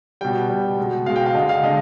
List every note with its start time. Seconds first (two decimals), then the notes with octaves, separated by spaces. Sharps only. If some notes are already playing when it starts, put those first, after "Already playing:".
0.21 B2 G3 G5
0.49 B2 G3
0.78 B2 G#3
1.06 B2 F5
1.10 G#3
1.16 G5
1.26 F5
1.34 D3 G#3 D#5
1.49 F5
1.63 D3 G#3 D#5